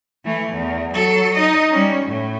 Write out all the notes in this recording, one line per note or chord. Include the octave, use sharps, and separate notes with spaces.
E3 A3
E2
F#3 A4
D#4 D#5
G3 C#4
A2